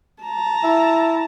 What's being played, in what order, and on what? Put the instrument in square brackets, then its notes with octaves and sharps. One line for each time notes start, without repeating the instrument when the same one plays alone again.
[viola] A5 A#5
[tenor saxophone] E4